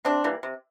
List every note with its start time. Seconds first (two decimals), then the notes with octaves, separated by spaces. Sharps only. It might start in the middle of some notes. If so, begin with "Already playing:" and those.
0.05 C3 C4 D4
0.24 E3 G3 A#3
0.43 C3